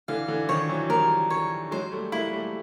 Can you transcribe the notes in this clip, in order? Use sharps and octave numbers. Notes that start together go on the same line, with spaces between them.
D3 E3 F5
D3 E3
D#3 F3 C#5
E3 F#3
F3 G3 A#4
C#5
F#3 G#3 C5
G3 A3
G#3 A#3 E4
G3 A3